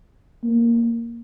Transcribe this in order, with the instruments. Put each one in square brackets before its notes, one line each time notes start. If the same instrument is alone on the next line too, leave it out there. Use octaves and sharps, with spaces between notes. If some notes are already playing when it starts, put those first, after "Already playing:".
[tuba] A#3